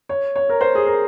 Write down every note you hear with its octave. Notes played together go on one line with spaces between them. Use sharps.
C#5
C#5
A#4
C5
G#4
A#4